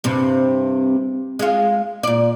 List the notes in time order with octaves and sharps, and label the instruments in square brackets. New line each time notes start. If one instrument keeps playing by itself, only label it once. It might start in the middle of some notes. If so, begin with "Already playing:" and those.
[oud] G2 C3
G#3 F4
A#2 D5